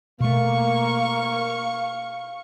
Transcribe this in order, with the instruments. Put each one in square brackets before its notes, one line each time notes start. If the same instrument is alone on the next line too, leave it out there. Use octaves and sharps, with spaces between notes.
[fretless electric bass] B2 A3 [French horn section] A#3 [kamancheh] F5 C#6